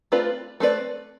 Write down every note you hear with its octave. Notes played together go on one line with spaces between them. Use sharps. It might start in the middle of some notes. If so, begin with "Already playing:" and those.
A3 C4 F4 B4 D5
A3 C4 F4 B4 D5